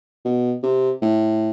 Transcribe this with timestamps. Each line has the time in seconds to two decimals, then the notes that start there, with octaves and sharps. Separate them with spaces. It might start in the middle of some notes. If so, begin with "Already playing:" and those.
0.25 B2
0.63 C3
1.02 A2